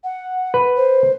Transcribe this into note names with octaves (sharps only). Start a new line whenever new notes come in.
F#5
B4
C5